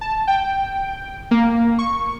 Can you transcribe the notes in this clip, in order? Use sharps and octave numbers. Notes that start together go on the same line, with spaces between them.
A5
G5
A#3
C#6